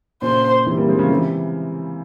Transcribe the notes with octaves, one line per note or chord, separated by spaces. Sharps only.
A#2 C#3 C5
C3 E3
G3 A#3
G#3 C4
C#3 F3
C3 E3